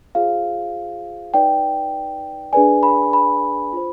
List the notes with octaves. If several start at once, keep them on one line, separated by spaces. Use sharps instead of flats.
F4 G#4 C5 F5
D#4 B4 D5 G5
D4 G#4 B4 D5 G#5
B5
B5
F4 C5